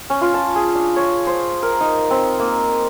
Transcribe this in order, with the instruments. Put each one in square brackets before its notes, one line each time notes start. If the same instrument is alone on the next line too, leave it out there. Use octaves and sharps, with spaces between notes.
[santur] C#4
F4
A5
G#4
D4
C#5
C5
A#4
D#4
C4
A#3